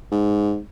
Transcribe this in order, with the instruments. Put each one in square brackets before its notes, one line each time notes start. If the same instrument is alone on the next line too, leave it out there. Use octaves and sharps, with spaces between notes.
[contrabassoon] G#2